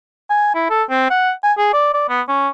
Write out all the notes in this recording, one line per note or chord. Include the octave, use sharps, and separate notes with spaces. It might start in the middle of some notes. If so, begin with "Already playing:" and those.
G#5
E4
A4
C4
F#5
G#5
G#4
D5
D5
B3
C#4